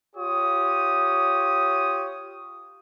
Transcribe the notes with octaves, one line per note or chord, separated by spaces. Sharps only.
F4 G4 C#5 D#6